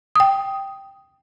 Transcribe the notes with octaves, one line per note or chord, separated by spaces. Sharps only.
G5 D#6